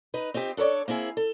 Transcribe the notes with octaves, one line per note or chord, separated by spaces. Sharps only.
D#4 B4
C4 D#4 F4 G4
D4 A4 A#4 C#5 D5
A#3 C4 E4 G#4
A4